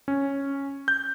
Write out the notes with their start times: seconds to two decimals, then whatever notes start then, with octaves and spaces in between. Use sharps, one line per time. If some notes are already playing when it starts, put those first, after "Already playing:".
0.08 C#4
0.88 G6